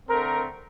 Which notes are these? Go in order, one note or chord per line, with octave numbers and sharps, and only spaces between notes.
D3 A3 C4 A#4